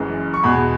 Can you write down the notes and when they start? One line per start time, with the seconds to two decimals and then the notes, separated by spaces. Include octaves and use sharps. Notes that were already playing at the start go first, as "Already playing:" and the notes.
Already playing: F#1 F#2 E3 G#3
0.34 C#6
0.43 E2 B2 G#3 B5